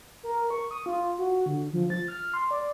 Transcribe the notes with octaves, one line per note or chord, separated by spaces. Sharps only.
A#4
C#6
D#6
F4
F#4
D3
F3
A6
F6
C6
D5